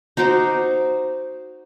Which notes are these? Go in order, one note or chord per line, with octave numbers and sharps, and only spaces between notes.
D#4 F#4 C5 D6